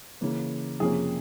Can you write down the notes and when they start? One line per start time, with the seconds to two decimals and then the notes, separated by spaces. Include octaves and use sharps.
0.21 C#3 E3 A#3
0.80 F2 C3 F3 A#3 C#4 G#4